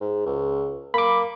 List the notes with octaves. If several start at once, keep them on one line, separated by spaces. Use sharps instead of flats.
G#2
C#2
A#3 B5 D6